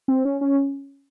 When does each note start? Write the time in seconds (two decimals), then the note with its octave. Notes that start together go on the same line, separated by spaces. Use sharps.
0.08 C4
0.25 C#4
0.41 C#4